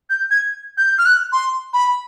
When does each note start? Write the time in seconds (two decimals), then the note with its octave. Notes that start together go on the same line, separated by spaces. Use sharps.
0.10 G6
0.31 G#6
0.78 G6
0.98 F6
1.06 F#6
1.32 C6
1.73 B5